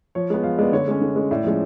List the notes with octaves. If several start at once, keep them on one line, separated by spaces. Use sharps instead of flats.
F3 C#5
G#3 B3
F3 F5
G#3 B3 D5
D3 C#5
G#3 C#4
D3
G#3 C#4
A2 D5
F3 G#3 C#4